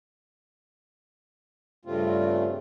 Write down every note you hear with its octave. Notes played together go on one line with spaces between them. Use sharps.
G2 C#3 G3 A3 C4 F4